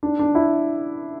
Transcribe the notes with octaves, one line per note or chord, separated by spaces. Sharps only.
D4
D4
E4